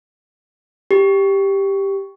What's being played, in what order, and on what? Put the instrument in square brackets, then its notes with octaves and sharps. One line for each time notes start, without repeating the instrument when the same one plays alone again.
[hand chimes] G4